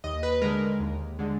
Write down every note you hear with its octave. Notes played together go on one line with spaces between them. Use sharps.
D#2 D#5
B4
D3 G#3 A#4
D#2
D3 G#3